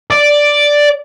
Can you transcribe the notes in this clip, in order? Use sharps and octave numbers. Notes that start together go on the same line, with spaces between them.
D5